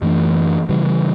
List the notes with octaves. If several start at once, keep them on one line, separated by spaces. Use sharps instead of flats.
F#2 E3 A3 D4
C#3 E3 G3